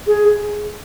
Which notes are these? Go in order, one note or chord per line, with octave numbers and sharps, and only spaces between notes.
G#4